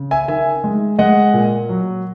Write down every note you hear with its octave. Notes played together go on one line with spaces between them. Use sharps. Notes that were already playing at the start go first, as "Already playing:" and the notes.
Already playing: C#3
E5 G#5
D#3 E5 G#5
G#3
G#3 D#5 F#5
A#2
F#3